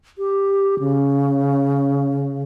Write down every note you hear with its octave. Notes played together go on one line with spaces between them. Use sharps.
G4
C#3